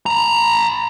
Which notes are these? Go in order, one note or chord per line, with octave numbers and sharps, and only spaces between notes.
A5 A#5